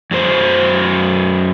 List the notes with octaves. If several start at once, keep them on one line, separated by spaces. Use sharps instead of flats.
F#2 F#3 C5